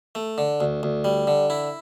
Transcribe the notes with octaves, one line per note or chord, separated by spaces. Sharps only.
A3
D3
D2
D2
G3
D3
E4